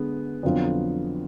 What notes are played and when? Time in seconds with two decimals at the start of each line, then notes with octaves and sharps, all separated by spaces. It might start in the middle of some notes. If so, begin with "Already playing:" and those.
Already playing: D3 G#3 B3
0.43 F2 D3 F#3 B3 F4